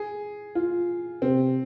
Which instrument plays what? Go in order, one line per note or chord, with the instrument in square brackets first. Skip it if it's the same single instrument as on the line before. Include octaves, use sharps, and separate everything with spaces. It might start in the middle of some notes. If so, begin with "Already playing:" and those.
Already playing: [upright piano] G#4
F4
[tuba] C3 [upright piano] C4